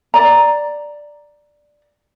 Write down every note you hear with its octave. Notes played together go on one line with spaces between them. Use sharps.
D5 A#5